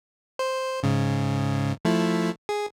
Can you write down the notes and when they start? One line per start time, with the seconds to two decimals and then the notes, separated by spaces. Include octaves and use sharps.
0.39 C5
0.83 G#2 C#3
1.85 F3 A3 E4
2.49 G#4